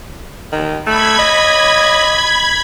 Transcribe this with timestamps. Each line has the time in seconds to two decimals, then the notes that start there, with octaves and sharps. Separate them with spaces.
0.53 D#3
0.86 A3 B5 G#6
1.19 D#5